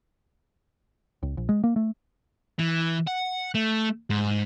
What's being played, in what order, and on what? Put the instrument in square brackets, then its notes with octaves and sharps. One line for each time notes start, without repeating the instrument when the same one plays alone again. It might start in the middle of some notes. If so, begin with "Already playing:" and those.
[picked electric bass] C#2
A#1
G#3
A#3
A3
[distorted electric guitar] E3
F#5
A3
G#2